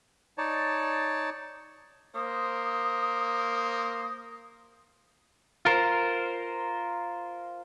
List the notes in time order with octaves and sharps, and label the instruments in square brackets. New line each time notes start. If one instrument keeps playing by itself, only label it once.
[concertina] D#4 C#5 D5 A5
[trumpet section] A#3 C5 [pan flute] D#6
[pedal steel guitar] F4 A#4 C5